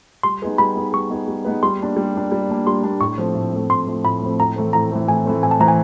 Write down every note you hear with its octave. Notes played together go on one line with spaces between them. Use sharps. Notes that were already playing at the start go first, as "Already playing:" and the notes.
G3 C6
B3 D#4 G#4 B4
G3 B5
B3 D#4 G#4 B4
G3 C#6
B3 D#4 G#4 B4
G3
B3 D#4 G#4 B4
G3 C6
A#3 D4
G3
A#3 D4
G3
A#3 D4
G3 C6
A#3 D4
A2 C#6
F3 A3 C4
A2
F3 A3 C4
A2 C6
F3 A3 C4
A2 B5
F3 A3 C4
A2 A#5
E3 A3 C4
A2 A#5
E3 A3 C4
A2 G#5
E3 A3 C4
A2 G#5
A5
E3 A3 C4 A#5
G#5